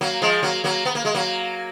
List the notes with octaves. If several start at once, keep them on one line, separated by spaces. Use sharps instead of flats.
F#3 A#3
F3 G#3
F#3 A#3
F#3 A#3
B3
A#3
G#3
F#3 A#3